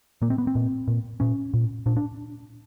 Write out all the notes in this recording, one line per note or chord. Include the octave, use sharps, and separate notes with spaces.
A#2 A#3
C4
B3
C4
A#2
A#2
A#2 C#4
A#2
A#2 D4
D4